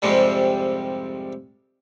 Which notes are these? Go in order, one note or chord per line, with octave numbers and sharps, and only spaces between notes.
F2 G#2 C3 G3